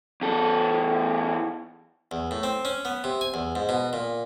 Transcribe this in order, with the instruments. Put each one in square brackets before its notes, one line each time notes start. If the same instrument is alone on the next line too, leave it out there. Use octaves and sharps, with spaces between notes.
[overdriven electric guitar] E2 A4
[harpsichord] E2
A2
C4
C#4
B3
C3
G#5
E2
G#2
B2
A#2